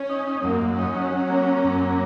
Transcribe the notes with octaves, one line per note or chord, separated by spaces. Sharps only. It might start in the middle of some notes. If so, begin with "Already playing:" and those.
Already playing: C#4
D#4
D#4
F#2 A#3
F#2
C#4 D#4
F#3
F#3
A#3
A#3
F#2
A#3